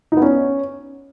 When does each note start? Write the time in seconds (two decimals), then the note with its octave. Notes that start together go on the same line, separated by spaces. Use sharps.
0.12 D#4
0.17 B3
0.22 C#4